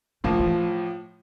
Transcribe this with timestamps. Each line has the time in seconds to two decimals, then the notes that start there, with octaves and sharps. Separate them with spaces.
0.24 A2 D#3 F3 A#3
0.39 E3